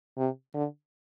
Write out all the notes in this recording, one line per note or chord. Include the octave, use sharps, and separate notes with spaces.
C3
D3